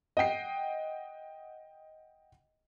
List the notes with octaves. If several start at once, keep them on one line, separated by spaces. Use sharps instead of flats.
D#5 F#5 G5 C7